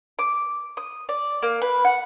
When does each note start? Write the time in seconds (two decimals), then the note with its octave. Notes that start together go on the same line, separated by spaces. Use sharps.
0.19 D6
0.77 D#6
1.09 D5
1.42 A#3
1.62 B4
1.85 F#5